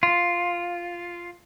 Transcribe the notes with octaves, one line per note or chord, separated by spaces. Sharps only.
F4